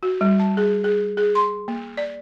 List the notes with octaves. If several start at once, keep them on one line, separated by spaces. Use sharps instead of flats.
F#4
G3
A5
G#4
G#4
G#4
C6
A#3
D5